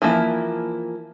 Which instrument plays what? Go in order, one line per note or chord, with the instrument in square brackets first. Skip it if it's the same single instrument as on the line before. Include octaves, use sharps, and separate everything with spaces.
[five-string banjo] E3 F3 A#3 E4